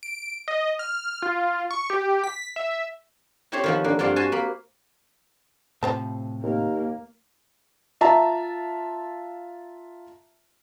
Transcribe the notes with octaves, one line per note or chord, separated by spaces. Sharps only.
D7
D#5
F6
F4
C#6
G4
B6
E5
C4 E4 G4 A4 C5 C#5
D#3 F3 B3
D3 A#3
G2 C4 F4 D5 F#5 C6
F#4 C5 G#5 A5
A#3 B5
A2 C3 F3 C5 A5
D#2 A#3
F4 E5 A5 A#5